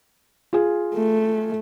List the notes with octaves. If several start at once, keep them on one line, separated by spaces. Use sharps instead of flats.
F4 G#4
A3